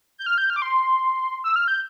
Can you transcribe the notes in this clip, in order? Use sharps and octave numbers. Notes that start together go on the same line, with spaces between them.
G6
F6
G6
F6
D6
C6
E6
F6
G6